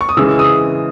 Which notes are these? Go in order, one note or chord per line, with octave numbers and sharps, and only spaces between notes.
C#6
D#6
C#3 E3 G#3 E6
D#6